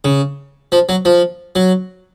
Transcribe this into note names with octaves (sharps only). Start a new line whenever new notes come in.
C#3
F3
F#3
F3
F#3